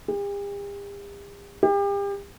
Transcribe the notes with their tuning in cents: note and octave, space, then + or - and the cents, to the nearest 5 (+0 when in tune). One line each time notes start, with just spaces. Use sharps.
G4 +45
G4 +35